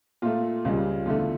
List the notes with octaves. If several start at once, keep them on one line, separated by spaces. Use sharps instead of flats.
A#2 A3 F4
C#2 C#3 G3
E2 D3 A3 F4